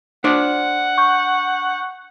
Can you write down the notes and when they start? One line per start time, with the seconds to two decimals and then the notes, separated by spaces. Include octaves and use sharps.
0.24 D4 C5 D5 F#5
0.98 C#6 G6